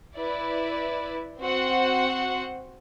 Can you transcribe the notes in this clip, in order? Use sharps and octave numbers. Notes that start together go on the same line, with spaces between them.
E4 B4 D5
C4 F#4 C5 F#5